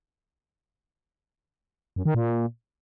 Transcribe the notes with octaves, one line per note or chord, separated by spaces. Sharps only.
F#2
D#3
A#2